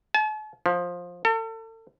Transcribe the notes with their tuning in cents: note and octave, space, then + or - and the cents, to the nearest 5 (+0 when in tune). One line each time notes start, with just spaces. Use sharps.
A5 -45
F3 +15
A4 +35